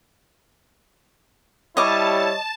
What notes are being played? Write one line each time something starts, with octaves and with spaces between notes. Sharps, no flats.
G3 E4 C#5 D#5 A5 D6